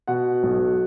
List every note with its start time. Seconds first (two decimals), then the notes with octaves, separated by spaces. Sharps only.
0.07 B2 F#5
0.43 B1